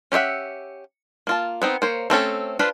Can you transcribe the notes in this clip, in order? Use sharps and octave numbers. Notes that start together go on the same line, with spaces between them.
C#4 G4 C5 E5 F#5
A#3 F4 A5
B3 C4 D#4
A#3 C5 C#5
A3 C4 C#4 A4
D4 F4 B4 C5